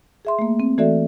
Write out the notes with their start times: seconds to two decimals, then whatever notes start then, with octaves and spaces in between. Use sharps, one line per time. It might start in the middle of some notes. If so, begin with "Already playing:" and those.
0.25 G#4 E5 C6
0.39 A3 A#3
0.60 C4
0.78 E3 A3 F#4 A4 D5 E5